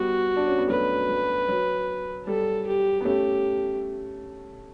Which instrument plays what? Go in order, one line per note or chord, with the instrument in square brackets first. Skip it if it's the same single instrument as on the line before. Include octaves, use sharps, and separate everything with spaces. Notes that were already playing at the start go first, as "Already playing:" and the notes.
Already playing: [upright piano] G3 B3 [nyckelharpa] F#4
[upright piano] D4
C#4
B3
[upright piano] F#3 A3 [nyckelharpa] B4
[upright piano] F#3
F#3
[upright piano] G3 [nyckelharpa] A4
[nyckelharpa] G4
[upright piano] B3
[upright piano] A3 C#4 [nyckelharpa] G4